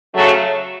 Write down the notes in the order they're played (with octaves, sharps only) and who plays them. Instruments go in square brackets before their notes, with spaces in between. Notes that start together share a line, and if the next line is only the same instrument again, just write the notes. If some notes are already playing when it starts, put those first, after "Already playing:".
[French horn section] C#3 F#3 A3